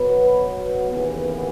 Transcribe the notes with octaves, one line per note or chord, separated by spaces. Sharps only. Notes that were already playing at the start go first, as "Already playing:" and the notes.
Already playing: B2 F#3 B3 B4
D#2 C#3 E3 B3